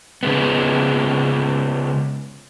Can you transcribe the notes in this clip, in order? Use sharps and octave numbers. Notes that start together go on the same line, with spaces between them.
C#3 G#3 B3